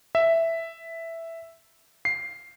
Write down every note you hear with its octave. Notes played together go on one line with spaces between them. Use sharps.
E5
C7